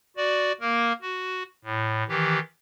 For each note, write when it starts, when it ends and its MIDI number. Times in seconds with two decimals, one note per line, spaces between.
0.17 0.52 66
0.17 0.52 74
0.61 0.93 58
0.61 0.93 70
1.02 1.43 66
1.65 2.04 45
2.08 2.39 51
2.08 2.39 52
2.08 2.39 67